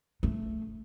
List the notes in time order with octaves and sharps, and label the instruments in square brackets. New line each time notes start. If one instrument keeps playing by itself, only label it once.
[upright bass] A3